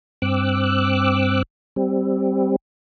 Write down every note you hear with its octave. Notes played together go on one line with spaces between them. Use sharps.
G2 C4 D6 E6 F#6
G3 C4